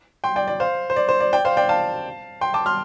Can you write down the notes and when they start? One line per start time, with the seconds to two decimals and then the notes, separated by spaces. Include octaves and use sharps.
0.24 G5 C6
0.36 D5 G5
0.48 D5
0.60 C5 F5
0.90 C5
0.96 D5
1.09 C5
1.20 D5
1.33 D5 G5
1.45 C5 F5
1.57 D5 G5
1.69 F5 A5
2.41 G5 C6
2.54 A5 D6
2.66 C6 F6